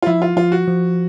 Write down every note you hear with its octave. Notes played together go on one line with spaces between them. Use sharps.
F4
F3 E4
F4
F3 F4
F#4
F3